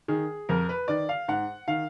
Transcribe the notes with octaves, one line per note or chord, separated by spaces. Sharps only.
D#3 G#4
F2 A#4
B4
D#3 D5
F5
G#2 F#5
D#3 F5